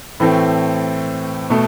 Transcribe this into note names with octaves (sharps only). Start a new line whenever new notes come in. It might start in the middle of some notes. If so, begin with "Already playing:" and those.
A2 E3 A3 C4
B2 A3